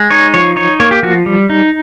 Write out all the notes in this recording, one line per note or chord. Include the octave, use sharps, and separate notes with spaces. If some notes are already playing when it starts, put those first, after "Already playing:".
Already playing: G#3
D#4 C#5
F3 C#5
D#4 C#5
A#3 C#5
G4
F3 F#4
G3
D#4